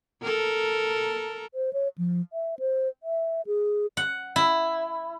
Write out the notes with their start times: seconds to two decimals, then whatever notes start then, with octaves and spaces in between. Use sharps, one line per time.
0.23 A4 A#4
1.53 C5
1.73 C#5
1.98 F3
2.33 E5
2.59 C5
3.03 E5
3.47 G#4
3.97 F#5
4.36 E4